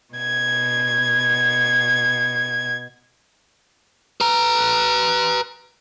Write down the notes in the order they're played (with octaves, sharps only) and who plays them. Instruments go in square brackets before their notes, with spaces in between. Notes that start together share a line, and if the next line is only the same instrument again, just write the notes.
[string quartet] B2 G#6
[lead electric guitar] B4 A#5